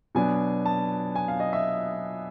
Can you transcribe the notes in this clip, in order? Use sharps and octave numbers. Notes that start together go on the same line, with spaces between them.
B2 F#3 B3 D4 G#5
A5
G#5
F5
D#5
E5